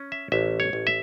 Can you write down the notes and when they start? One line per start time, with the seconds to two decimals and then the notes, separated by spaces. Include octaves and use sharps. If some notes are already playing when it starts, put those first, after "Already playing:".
Already playing: C#4
0.12 E5
0.32 A1 E5
0.60 C#5
0.73 A1
0.87 E5